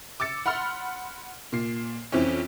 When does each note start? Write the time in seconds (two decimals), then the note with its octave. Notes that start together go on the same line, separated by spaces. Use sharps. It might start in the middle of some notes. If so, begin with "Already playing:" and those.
0.20 D6 E6 A6 C#7
0.46 F#5 B5 C6 F6
1.53 A#2 C7
2.12 F2 E3 C4 C#4